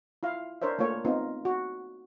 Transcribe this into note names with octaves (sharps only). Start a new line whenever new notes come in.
E4 F4 F5
D4 A#4 C5 C#5 E5
A3 A#3 F4 C#5
B3 C4 D#4 F4
F#4